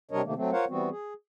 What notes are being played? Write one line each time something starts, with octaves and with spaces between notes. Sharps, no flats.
C3 G3 D4 A#4 C#5 D#5
C3 D#3 A3 A#3
F#3 A3 C4
F4 A#4 C5 C#5 F5 F#5
E3 G3 B3 C4 F#4
G#4